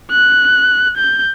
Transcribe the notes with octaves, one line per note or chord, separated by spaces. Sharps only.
F#6
G6